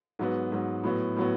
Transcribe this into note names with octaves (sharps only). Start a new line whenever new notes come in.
G#2 F#3 B3
G#2 F#3 B3
A2 F#3 B3
A2 F#3 B3